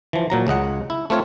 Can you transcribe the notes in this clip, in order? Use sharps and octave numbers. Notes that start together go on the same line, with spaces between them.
E3 F3
A#2 F#3 A#5
C#2 C#3 D#5 F#5
E4
A3 C4 F4 C#5